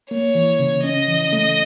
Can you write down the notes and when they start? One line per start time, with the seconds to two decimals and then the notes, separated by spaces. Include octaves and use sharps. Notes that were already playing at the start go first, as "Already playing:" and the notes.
0.11 A#3 C#5
0.35 E3
0.59 C#3
0.84 C#4 D#5
1.08 E3
1.33 A3